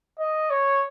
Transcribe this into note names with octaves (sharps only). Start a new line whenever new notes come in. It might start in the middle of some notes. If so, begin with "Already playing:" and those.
D#5
C#5